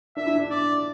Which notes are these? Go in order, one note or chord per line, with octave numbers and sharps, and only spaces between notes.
D4 E5
E4
D4
D5